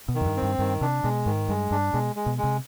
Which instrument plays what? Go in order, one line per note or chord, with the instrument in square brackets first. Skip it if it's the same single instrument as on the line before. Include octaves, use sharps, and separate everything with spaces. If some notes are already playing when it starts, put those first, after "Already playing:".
[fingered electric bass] B2
[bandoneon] D#3
[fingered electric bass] F2
G2
[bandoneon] C4
[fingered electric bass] G2
[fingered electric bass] G2 [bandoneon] D#3
[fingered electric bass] C3 [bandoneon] D4
[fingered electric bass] B2 [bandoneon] G#3
[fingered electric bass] G#2 [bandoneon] D#3
[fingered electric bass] G2 [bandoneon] G#3
[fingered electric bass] G2 [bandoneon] D4
[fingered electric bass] B2 [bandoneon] G#3
[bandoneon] G#3
[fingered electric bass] B2
[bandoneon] G#3
[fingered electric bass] C3